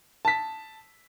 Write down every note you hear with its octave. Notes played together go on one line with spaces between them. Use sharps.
A5 B6